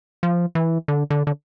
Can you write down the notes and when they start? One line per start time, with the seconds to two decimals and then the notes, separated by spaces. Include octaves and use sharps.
0.23 F3
0.55 E3
0.88 D3
1.10 D3
1.27 D3